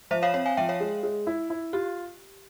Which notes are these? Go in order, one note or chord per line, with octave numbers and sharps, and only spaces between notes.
F3 C5 E5
C#5 F5
C4 C#5 F5
F5 G#5
F3 E5 G5
C#5 F5
G#3
G#3
E4
E4
F4 G4